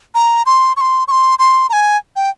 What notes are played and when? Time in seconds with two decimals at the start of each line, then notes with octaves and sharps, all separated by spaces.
0.15 A#5
0.46 C6
0.77 C#6
0.81 C6
1.08 C#6
1.11 C6
1.39 C6
1.70 A#5
1.73 G#5
2.16 G5